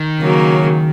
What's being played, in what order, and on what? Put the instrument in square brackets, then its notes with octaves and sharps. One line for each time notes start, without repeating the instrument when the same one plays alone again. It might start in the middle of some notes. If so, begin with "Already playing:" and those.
Already playing: [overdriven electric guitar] D#3
[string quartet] C#3 F#3 A#3